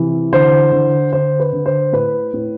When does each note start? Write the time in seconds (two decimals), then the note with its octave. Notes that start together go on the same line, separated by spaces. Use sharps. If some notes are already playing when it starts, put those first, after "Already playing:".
Already playing: C3 E3
0.33 D3 C5
0.72 D3
1.13 D3 C5
1.40 B4
1.53 D3
1.66 C5
1.93 A2 B4
2.33 A2